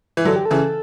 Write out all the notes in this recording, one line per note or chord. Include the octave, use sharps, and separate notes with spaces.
E3
D3 F#3 A4
G4
A4
C#3 E3